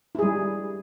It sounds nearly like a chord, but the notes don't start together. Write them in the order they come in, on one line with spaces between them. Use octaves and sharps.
E4 G#4 G3